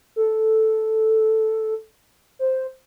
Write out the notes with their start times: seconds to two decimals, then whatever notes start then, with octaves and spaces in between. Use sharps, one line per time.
0.16 A4
2.39 C5